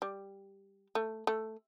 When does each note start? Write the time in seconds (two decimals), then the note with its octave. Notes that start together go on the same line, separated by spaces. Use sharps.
0.02 G3
0.95 A3
1.27 A3